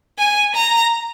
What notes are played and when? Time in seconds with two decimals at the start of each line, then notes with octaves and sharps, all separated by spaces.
0.19 G#5
0.55 A#5